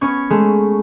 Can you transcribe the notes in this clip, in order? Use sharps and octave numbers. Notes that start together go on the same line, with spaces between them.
B3 C#4 C#6 G#6
G#3 A3